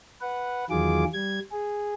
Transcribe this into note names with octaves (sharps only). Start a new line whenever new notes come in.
B4 F#5
E2 D#3 F#3 F4 G#4 D6
G3 G#6
G#4